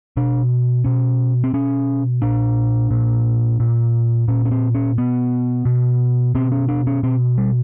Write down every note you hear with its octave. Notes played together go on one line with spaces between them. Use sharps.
B2 D4
B2 C#4
C4
B2 C#4
A#2 D4
A#2
A#2
A#2 C#4
C#4
C4
C#4
B2 B3
B2
B2 C4
C#4
D4
C#4
B2 C4
G3